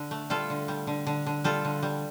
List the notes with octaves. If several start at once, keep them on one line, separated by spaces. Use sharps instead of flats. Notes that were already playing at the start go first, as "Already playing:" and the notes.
Already playing: D3
A3
G3 F4 A4
D3
G3
D3
D3
D3
G3 F4 A4
D3
G3